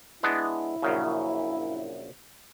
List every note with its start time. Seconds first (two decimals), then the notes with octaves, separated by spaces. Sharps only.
0.23 G#3 B3 D4 E4
0.82 A#1 F#2 C#3